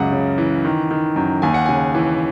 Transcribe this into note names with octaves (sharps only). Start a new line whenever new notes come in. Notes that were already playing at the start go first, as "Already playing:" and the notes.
Already playing: C#2 F#2 F#5
C#3
E3
D#3
D#3
F#2
D#2 G#5
F#5
C#3 G#5
E3